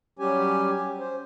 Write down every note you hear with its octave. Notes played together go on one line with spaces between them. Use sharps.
F#3 G3 C#4 G4 G#5
C5